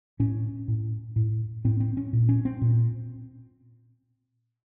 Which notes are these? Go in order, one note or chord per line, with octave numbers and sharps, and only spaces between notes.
A2 C#4
A2
A2
A2 C4
C4
C#4
A#2
C#4
C4
A#2